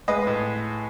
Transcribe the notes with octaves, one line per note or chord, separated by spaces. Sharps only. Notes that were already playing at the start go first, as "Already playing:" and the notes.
G#3 B4 D#5
A2